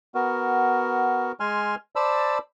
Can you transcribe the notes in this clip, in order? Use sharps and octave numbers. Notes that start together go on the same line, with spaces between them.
B3 F#4 A#4
G#3 G#5 C6 F6
C5 D5 A5 B5 E6